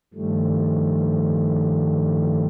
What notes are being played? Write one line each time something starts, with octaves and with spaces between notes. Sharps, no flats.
G2 D#3 F3 G3 A3